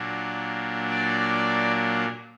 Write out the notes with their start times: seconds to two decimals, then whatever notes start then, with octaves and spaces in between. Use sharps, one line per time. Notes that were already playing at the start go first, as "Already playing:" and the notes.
Already playing: A#2 F#3 A#3 D4
0.91 D5